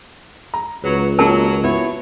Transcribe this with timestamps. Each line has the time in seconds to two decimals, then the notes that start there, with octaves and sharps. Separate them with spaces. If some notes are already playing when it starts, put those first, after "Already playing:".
0.54 A#5
0.84 C#2 F#3 B4
1.19 D#3 F#3 G#3 A#3 F4 A#4 A5
1.64 B3 E4 F#4 C#5